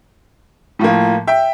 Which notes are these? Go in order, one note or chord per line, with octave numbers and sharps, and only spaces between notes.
A2 F3 A#3
E5 G5